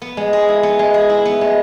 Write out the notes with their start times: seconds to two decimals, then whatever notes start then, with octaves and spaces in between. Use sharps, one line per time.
0.02 B3
0.17 G#3
0.33 G#4
0.49 E4
0.63 B3
0.79 G#3
0.94 G#4
1.09 E4
1.25 B3
1.41 G#3